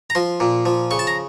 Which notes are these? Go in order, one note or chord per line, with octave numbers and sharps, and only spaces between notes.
A#5
F3 C6
A#2
F3
C#3 C#6
A5
A#5